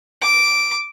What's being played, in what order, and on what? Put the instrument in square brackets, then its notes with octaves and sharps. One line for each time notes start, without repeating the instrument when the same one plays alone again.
[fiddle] D6